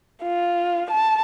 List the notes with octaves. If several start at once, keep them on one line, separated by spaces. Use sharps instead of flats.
F4
A5